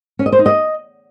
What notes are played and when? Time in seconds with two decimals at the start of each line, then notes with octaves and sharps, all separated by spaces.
0.19 C#4
0.26 D#5
0.32 C5
0.39 D#4
0.46 D#5